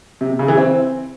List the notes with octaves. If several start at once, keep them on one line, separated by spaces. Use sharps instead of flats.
C3
B2
C#3
E3
C4